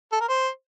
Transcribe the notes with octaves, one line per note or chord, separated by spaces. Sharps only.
A4
A#4
C5